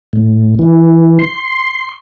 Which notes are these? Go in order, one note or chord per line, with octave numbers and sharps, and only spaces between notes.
A2
E3
C6